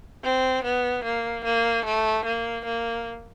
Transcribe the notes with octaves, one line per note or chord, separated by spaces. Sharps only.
C4
B3
A#3
A#3
A3
A#3
A#3